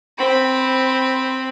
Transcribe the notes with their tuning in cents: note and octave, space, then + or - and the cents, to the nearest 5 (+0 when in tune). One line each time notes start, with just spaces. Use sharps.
C4 +0 B5 +0